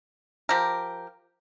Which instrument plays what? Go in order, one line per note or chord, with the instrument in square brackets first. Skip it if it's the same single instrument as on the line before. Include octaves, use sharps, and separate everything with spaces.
[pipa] F3 G4 A#4